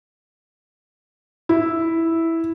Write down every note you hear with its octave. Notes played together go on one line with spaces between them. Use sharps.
E4